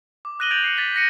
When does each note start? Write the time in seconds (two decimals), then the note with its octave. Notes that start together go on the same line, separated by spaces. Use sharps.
0.25 D6
0.39 D#6 F#6 A#6 D#7 F#7 G7
0.51 G6 A6 D7 D#7 F7 F#7
0.64 C7 C#7
0.77 A6 B6 G7
0.95 F#6 A#6 C#7 D#7